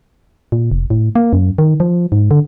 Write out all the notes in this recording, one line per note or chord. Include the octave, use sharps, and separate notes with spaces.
A#2
F1
A2
A#3
F#2
D#3
F3
G#2
D3